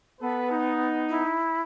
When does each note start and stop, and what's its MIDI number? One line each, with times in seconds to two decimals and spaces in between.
0.21 1.23 59
0.21 0.49 69
0.21 0.49 71
0.50 1.38 63
1.09 1.61 64